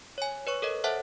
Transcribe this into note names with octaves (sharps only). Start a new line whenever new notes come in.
C#5 G#5
B4 C#5 C#6
A4 A#4 C#5 D#5
A4 C5 E5 F#5 A5 F#6